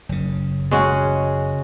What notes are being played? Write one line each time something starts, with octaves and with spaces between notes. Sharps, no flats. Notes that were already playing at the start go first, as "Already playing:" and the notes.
F#1 C#3
G#3 C#4 F#4